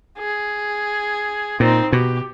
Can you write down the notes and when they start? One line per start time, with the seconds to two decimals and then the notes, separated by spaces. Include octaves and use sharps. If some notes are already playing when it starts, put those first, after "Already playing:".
0.19 G#4
1.60 A#2 C4 D#4
1.93 B2 G4